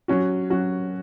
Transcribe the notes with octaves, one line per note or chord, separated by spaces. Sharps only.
F#3 C#4 F#4
F#3 C#4 F#4